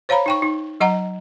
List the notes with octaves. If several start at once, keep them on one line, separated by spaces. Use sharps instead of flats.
C5 C#5 F5 A#5 B5
D#4 G5 C#6
D#4
F#3 D#5 F#5 A#5